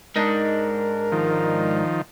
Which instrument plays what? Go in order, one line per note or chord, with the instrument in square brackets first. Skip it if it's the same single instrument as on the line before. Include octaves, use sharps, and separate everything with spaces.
[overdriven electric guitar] G#2 [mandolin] D4 D#4 [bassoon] A#4
[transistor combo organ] D#3 F3